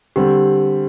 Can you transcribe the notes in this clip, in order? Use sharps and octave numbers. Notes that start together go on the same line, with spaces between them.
D3 G3 C4 G4